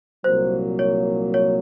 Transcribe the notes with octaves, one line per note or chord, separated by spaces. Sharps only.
C2 A#2 F#3 A#3 C5
C#5
C#5